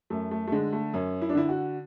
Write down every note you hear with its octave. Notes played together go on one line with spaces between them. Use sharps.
F#2 A3
A3
A3
D3 G#3
A3
F#2 C#4
E4
D4
D3 E4
F#4